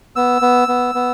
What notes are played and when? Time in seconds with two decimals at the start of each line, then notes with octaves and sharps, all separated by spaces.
0.16 B3 E6
0.42 B3
0.68 B3
0.95 B3